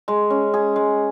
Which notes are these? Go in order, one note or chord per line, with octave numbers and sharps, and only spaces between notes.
G#3
C#4
G#4
G#3